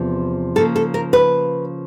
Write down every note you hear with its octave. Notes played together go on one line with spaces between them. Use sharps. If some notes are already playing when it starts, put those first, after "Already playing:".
Already playing: E2 C3 F3 B3
C#3 F3 A#3 A4
A4
A#4
B4